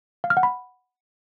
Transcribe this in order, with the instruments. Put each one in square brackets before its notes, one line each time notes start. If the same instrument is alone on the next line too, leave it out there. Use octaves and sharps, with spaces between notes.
[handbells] F5
F6
F#5
B5